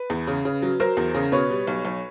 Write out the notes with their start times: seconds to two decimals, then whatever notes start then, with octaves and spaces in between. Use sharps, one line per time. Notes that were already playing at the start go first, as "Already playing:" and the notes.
Already playing: B4
0.10 E2
0.27 C#3
0.45 C#3
0.62 F#3
0.80 F#3 A#4 C5
0.97 E2
1.15 C#3
1.32 B2 B4 C#5
1.50 G3
1.67 B1
1.85 B1